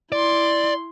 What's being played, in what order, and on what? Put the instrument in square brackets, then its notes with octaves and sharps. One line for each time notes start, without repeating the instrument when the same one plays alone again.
[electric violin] E4 C6 [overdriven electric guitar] D5